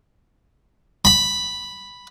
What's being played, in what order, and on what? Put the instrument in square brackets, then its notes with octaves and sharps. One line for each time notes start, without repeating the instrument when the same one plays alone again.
[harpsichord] B5